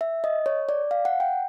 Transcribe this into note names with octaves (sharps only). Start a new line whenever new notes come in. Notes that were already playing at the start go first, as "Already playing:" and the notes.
E5
D#5
C#5
D5
F5
F#5
G5